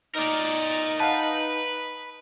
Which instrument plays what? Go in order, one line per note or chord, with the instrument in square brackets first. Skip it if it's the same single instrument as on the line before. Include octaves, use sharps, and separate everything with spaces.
[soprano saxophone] D#4 [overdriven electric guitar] A#4 D5
[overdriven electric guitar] B4 [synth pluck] F5 F#5 A5